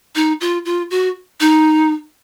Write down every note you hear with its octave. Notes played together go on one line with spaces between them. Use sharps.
D#4
F4
F4
F#4
D#4